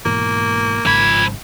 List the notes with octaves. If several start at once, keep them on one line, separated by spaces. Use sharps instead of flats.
G#2 B2 E3 A#3
G#1 G#2 C#3 F3 B5 G#6